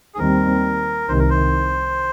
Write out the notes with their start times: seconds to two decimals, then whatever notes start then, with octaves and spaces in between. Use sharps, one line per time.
0.14 G#4
0.19 D#2 D#3 G3 C4 A#4
1.08 C2 C3 D#3 C5
1.19 A#4
1.30 C5